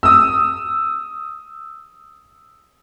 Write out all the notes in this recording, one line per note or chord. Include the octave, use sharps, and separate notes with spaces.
D#6 E6